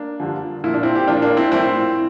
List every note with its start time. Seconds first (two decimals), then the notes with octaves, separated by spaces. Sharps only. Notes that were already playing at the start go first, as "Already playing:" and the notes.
Already playing: A#3 D4
0.20 G2 D3 F3
0.64 A#2 F3 E4
0.74 D4
0.83 C4 E4
0.95 G4
1.08 A#2 F3 D4 F4
1.22 A#3 D4
1.37 C4 E4
1.51 A2 F3 C4 E4